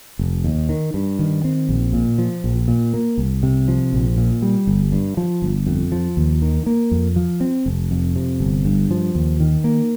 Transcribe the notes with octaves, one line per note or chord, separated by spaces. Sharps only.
F1
D#2
D#3
G2
D#3
C4
A#1
A#2
F3
A#1
A#2
A#3
C2
C3
F3
A#1
A#2
G3
G1
G2
F3
G1
F2
F3
D#2
D#3
A#3
F2
F3
C4
F1
F2
C3
G1
G2
F3
D#2
D#3
A#3